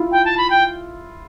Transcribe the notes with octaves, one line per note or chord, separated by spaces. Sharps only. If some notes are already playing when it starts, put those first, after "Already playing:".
Already playing: E4 F4
G5
A5
B5
G5